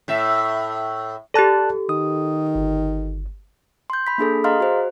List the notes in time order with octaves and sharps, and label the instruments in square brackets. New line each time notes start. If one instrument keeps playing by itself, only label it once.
[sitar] A2 E5
[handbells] G4 A4 [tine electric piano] D5 A5 F#6
[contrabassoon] D#3 [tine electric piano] D#6
[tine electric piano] G1
[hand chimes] C6 G6
B5 B6
A#3 D4 G#4 A4
G#4 D#5 F5 A#5 C6 F6
F#4 C5